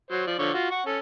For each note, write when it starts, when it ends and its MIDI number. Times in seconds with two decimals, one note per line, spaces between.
0.11 0.24 54
0.11 0.24 72
0.27 0.35 53
0.27 0.35 74
0.39 0.51 50
0.39 0.51 53
0.39 0.51 73
0.54 0.67 65
0.54 0.67 66
0.71 0.82 78
0.71 0.82 85
0.86 0.99 61
0.86 0.99 69